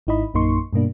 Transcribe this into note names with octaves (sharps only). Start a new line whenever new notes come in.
G#1 G#2 D#4 E4 D#5 B5
A#1 F#2 A#3 D#4 C6 C#6
G2 B2 A#3 D4